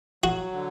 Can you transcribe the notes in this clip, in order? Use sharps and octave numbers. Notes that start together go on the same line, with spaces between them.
F#3 F#4
D3